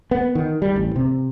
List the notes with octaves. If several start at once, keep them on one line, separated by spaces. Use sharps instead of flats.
B3
D#3
G3
A1
C3